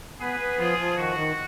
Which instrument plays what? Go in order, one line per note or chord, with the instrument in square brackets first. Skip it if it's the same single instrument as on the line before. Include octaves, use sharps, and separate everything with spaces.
[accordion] B3 [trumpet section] G#4 B4
[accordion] B3
[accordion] F3 [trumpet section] F4 G#4
[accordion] F3
[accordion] D#3 [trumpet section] F#4
[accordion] D#3